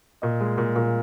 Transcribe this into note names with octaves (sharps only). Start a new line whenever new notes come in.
A#2 D#5
G#3
A#2
A#2